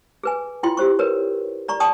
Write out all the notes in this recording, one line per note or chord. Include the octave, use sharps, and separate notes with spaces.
G#4 B4 G#5
E4 F4 G5 C6
G4 C5 C#6
A#4 B4 C#5
D5 A#5 C#6
D5 G5 A5 C#6 D#6